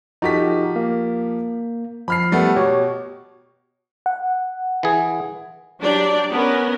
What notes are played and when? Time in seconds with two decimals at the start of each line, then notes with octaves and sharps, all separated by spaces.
0.22 F3 D#4 F#4 G4 A4 B6
0.76 A#3
2.08 F3 B5 F6 C7
2.32 G3 A3 B3
2.56 B2 G4 C#5
4.06 F#5
4.83 E3 G#4
5.81 F#3 D4 G4 D5
6.31 B3 C#4 A#4